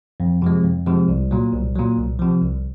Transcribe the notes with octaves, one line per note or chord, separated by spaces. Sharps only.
F2
C3 F3 G#3
F2
C3 F3 G#3
C2
A#2 F#3
C2
A#2 F#3
C2
C3 F3
C2